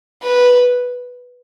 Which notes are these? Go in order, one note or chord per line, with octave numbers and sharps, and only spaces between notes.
B4